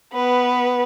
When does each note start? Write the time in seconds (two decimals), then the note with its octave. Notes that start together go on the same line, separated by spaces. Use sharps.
0.13 B3 B4